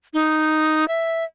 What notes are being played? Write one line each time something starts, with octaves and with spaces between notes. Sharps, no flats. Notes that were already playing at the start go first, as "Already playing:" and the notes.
D#4
E5